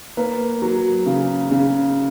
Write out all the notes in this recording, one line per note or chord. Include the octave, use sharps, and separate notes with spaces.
A#3 B4
F#3
C#3
C#3